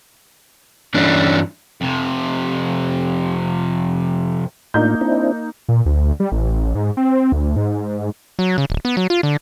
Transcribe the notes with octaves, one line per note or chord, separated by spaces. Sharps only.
G2 E3 C#4 D4
F2 C3
A2 A#3 D4 D#4 F4 G6
C4 D4 E4
A#2
D2
G3
A1
G#2
C4
D2
G#2
F#3
C#3
D1
B3
F#3
F4
D3